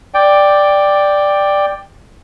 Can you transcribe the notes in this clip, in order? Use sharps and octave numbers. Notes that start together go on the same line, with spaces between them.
D5 G5